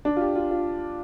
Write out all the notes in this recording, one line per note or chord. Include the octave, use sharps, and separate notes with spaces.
D4
F4
G4
F4
F4